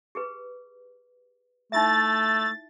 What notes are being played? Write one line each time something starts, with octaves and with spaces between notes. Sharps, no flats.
G4 G#4 B4
A3 D#4 E4 E5 A6